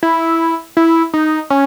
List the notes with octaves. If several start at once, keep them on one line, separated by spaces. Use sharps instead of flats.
E4
E4
D#4
C#4